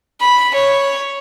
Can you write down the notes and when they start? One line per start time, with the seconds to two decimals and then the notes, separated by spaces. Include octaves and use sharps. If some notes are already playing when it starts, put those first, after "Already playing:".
0.21 B5
0.54 C#5